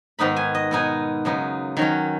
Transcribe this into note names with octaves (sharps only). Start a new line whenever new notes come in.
G#2 D#3 B3 D#4 B5
G#5
D#5
B2 B3 D#4 G#5
F#2 C#3 B3 D#4
D#3 F#3 C#4